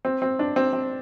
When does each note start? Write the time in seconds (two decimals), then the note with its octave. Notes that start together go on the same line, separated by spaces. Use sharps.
0.05 C4
0.22 C4
0.39 D4
0.56 C4
0.73 C4